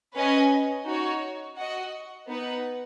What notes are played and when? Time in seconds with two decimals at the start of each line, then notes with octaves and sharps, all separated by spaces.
0.15 C#4 B4 D#5 G#5
0.86 D#4 F#4 C#5
1.57 F#4 D#5 F#5
2.29 B3 D#4 B4 F#5